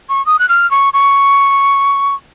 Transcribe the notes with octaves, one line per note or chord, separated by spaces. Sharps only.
C#6
D#6
F#6
F6
C#6
C#6